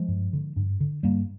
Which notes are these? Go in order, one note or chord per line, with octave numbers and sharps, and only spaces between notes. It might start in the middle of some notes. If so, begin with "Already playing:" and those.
Already playing: F3 G#3
G2
D3
G2
D3
G2 G3 A#3